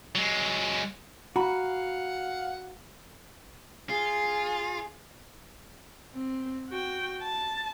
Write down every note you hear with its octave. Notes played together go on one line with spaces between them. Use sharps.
F#3 G#3
F#4 F5 F#5 A#5 B5
F4 G#4
C4
F#4 G5
A5